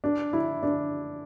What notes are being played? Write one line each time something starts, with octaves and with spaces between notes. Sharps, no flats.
D4
E4
D4